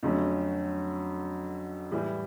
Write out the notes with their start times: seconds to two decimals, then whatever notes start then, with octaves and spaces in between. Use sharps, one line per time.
0.03 F2 D3 F#3 A3 C#4
1.92 A2 E3 G3